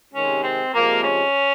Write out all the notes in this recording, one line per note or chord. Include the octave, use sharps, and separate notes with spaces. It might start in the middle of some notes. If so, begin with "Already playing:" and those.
C3 D#3 G#3 C#4
C4
C3 F3 G#3 A#3
C#4